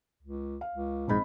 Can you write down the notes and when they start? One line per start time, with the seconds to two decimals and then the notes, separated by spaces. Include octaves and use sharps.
0.22 C#2
0.61 F5
0.74 C#2
1.08 A#1 G#2 C4 D#5 B5